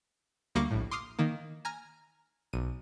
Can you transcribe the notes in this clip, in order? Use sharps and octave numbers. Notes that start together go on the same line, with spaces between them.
D2 G3 A#3 C#6 D6 A#6
A#1 A2
C6 D6 D#6 F6 C7
D#3 A#3
G#5 A#5 F6
B1 D#7